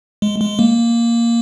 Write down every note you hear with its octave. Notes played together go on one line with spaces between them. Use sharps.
G#3
G#3
A#3